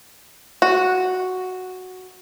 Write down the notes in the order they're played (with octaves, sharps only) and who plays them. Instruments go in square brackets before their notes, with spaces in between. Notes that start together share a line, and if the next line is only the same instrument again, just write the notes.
[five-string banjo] F#4